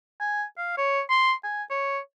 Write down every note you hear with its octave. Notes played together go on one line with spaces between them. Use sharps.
G#5
F5
C#5
C6
G#5
C#5